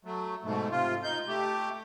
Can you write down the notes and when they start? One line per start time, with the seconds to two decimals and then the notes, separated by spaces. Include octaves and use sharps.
0.05 F#3 A3
0.44 G#2 B2 A3
0.71 C3 F4
1.03 D#4 G6
1.27 A3 G4